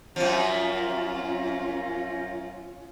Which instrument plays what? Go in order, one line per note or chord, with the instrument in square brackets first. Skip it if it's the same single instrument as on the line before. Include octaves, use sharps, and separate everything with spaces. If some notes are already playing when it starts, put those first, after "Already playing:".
[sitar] F#2 F3 [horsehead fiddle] C#4 F4